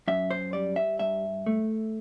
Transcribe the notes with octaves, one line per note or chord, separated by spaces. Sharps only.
F#2 E5
C5
G3 D5
E5
G2 E5
A3